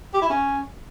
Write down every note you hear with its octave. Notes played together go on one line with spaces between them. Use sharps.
G4
E4
C#4